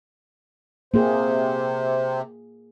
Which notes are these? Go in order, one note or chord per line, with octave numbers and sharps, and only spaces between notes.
C3 A#3 G#4 C5